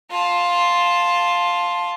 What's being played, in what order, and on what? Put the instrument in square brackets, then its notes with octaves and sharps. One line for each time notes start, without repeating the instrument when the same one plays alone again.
[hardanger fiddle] F4 A5